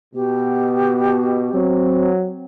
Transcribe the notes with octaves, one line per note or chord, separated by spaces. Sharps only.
B2 G4
F#3 C4